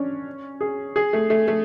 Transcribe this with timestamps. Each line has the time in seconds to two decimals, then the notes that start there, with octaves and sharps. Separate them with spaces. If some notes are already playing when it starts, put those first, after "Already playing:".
Already playing: C#4 D4
0.61 G#4
0.96 G#4
1.13 A3
1.30 A3
1.48 A3